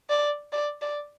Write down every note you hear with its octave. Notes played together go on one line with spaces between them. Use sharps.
D5
D5
D5